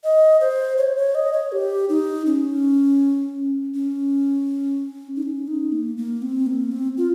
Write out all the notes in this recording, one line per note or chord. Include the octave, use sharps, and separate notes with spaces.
D#5
C5
C#5
C#5
D#5
C#5
G4
D#4
C#4
C#4
D#4
C#4
D#4
A#3
A#3
C4
A#3
C4
F4